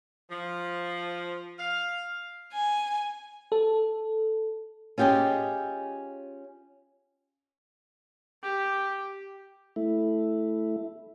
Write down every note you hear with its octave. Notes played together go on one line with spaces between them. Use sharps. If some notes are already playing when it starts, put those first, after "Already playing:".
F3
F5
G#5
A4
C#4 F4 G4 G#4 D#5
G4
A3 E4